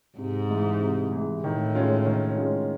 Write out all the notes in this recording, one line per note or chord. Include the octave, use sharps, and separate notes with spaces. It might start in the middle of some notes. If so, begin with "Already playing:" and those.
G#2 C3
E3 G#3
C3
E3 G#3
A2 D#3
G#3 C#4 F4
D#3
G#3 C#4 F4